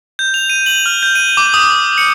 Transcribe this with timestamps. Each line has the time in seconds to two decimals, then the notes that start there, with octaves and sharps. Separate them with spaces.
0.19 G6
0.34 F7
0.50 D#7
0.66 F#7
0.86 F6
1.03 G6
1.15 D#7
1.37 D6
1.54 D#6
1.98 C#7